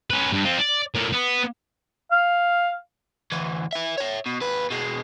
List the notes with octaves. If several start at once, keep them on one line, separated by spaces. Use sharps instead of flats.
C#4 B4
G2
C4 F4
D5
A2 A#3
B3
F5
D2 E3
B4 E5
C#5 E5
B2
D#2 B4
B2 G#3